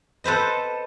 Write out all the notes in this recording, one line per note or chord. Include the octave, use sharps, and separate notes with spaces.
A4 B4 C5 D#5